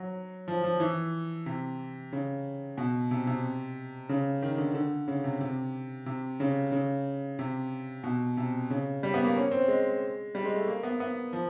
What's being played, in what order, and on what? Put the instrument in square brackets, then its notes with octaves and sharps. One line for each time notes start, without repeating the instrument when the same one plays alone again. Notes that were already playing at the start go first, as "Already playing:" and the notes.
Already playing: [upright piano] F#3
F3
F3
E3
C3
C#3
B2
C3
C3
C#3
D#3
D3
D3
C#3
C3
C3
C3
C#3
C#3
C3
B2
C3
C#3
G3
B3
A#3
C#4
C4
G#3
G3
G#3
A3
A#3
B3
B3
F3